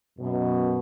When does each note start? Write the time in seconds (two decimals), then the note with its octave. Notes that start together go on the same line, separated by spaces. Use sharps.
0.19 F#2 B2